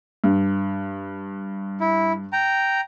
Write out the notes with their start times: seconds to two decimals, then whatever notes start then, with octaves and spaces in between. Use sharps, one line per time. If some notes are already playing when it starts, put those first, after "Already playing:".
0.24 G2
1.80 E4
2.33 G5 A#5